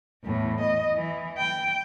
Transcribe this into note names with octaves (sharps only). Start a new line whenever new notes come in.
E2 A2
D#5
E3
G5